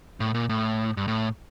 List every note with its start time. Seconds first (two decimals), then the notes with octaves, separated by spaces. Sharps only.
0.20 A2
0.35 A#2
0.49 A2
0.97 G2
1.08 A2